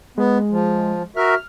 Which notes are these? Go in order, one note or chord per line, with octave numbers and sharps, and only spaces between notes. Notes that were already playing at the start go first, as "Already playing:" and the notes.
G#3 B3
F3
F#4 A#4 E5 F6